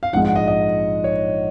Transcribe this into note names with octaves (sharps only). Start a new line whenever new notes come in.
F5
A#1 G#2 F3 G#3 F#5
F#5
D#5
D#5
C#5